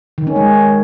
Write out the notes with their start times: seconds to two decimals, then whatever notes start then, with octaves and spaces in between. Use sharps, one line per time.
0.18 D#3
0.27 C#4
0.36 G#3